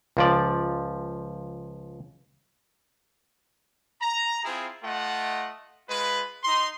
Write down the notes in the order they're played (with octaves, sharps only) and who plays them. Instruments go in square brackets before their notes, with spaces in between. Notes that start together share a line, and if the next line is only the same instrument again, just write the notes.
[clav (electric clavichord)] C#2 F3 D5
[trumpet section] A#5
C4 E4 F4 G#4
A3 F4 D#5 F#5
G#3 F4 B4
D#4 C6